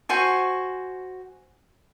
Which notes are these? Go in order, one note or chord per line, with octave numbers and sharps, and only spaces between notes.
F#4 C5 G#5 C#6